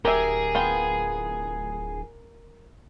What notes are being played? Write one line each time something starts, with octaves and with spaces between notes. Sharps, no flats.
D1 G4 G#4 A#4 E5 G#5
B3 F4 G5